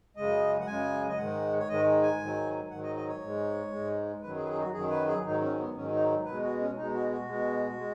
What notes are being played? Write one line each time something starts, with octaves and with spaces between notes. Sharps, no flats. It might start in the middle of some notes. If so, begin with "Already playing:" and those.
F#2 C#3 G#3 D#5
F#5
F#2 C#3 G#3 G#5
D#5
G#2 D#3 G#3 F#5
C#5
G#2 D#3 G#3 D#5
G#5
G#2 D#3 F#3
G#2 D#3 F#3 F#5
D#5
D#5
C#5
G#2 G#3
G#2 G#3
F#2 D#3 F#3 B4
G#4
B4
G#4
D#4
F#4
F#2 D#3 F#3 G#4
B4
G#4
G#2 D#3 F#3 D#4
C#4
B3
G#2 D#3 F#3 C#4
D#4
B2 G#3 B4
F#4
C#4
B2 G#3 D#4
F#4
F#4
B2 G#3
G#3